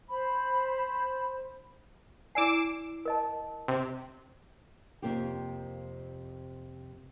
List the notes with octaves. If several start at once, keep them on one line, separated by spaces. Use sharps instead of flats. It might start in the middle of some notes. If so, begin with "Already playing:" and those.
C5 B5
E4 D5 G#5 D6 E6 C7
A#4 D#5 A5
C3
F2 C3 A#3 F4 G4